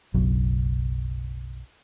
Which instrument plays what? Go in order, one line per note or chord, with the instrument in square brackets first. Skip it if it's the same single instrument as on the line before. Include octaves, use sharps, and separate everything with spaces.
[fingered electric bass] F#1 B1 F#3